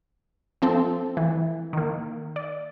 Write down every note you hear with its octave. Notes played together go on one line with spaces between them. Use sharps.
F3 C4 A4
E3
D#3 A#3
D5